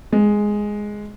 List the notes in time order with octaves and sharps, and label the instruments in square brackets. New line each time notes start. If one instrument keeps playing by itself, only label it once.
[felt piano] G#3